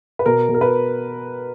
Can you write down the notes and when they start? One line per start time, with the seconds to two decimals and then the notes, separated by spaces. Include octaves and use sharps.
0.19 B4
0.26 B2 A#4
0.49 B2
0.54 A#4
0.61 B4